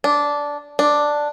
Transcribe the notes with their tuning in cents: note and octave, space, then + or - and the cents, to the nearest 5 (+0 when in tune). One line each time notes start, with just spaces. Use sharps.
D4 -10
D4 +5